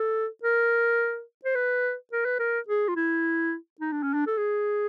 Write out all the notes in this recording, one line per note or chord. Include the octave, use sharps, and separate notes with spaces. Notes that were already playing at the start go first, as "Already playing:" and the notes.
Already playing: A4
A#4
C5
B4
A#4
B4
A#4
G#4
F4
E4
D#4
D4
C#4
D4
A4
G#4